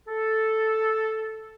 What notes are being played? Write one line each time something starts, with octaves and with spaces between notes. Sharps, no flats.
A4